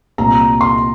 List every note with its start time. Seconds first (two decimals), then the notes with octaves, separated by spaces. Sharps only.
0.18 C2 A#2 A#5
0.61 C6